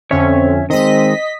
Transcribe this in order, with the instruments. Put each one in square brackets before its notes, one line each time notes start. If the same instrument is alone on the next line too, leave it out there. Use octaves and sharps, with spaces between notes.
[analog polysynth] F2 D3 C#4 [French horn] C4 [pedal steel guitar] C#5 E5 C#6
[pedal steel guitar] D#3 G#3 [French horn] C4 [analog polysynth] D#5 B6